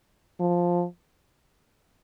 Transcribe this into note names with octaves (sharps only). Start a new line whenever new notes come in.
F3